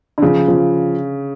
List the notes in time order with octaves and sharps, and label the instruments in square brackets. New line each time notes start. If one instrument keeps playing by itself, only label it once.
[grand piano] D3
[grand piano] C#3 [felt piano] F3
[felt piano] F3